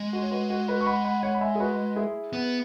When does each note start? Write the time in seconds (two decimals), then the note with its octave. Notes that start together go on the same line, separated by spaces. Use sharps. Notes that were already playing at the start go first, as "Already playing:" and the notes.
Already playing: G#3
0.13 F#4
0.22 C#5
0.31 F#4 B4
0.50 F#4
0.68 F#4 B4
0.81 C#6
0.86 F#5 B5
1.05 F#5 B5
1.23 C#5 F#5
1.34 B5
1.41 E5 G#5
1.55 G#4
1.60 F#4 B4
1.96 E4 G#4
2.33 B3